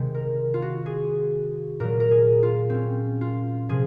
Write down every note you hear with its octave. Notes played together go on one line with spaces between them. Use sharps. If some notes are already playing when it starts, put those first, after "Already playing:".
Already playing: C3 D#3 G#3
A#4
F4
F#4
G#4
A#2 F#3 A#4
A#4
G#4
F4
C4 C#4
F4
C3 F3 G#4